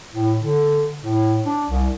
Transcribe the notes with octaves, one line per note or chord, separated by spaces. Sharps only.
A2
D3
A2
D4
C2